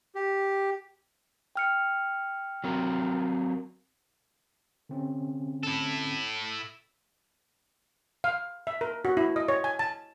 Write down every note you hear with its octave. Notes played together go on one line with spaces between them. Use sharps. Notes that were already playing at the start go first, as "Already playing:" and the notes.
G4
G5 F6 C#7
F#3 C4 A#4
D3 C4 C#4
E4 A4
F5
E5
A#4
F#4
E4
D#5
C#5
G#5
A5